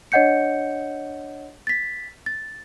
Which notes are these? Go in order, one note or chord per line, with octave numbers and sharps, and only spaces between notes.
D4 C#5 D#5 F#5 G6 C#7
A6 B6
A6